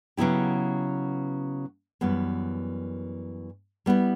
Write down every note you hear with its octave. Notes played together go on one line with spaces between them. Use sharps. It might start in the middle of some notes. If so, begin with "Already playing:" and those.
C#3 F#3 B3 E4 G4
F#2 E3 G3 B3
G3 B3 E4